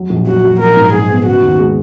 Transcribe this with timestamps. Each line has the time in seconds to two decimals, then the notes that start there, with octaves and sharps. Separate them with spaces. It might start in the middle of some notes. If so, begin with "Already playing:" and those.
Already playing: F#3
0.10 A#1
0.27 F#3 F#4
0.43 F#3
0.59 A#1 A#4
0.76 G#2
0.93 G#2 G#4
1.10 B3
1.26 C#3 F#4
1.42 D#2
1.59 G#3